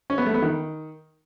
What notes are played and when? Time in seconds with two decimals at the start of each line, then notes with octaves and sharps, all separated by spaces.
0.10 C#4
0.18 B3
0.26 A3
0.34 B3
0.42 D#3